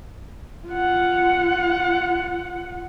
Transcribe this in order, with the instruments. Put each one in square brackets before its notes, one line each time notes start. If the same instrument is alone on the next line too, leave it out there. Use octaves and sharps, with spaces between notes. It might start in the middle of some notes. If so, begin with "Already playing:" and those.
[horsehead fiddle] F4 F#5